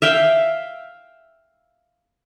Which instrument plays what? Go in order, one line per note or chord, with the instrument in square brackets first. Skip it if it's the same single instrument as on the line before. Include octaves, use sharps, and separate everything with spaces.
[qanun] E5 F5 G5